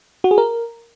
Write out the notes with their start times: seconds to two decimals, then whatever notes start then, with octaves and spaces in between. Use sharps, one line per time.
0.24 F#4
0.31 G#4
0.38 A#4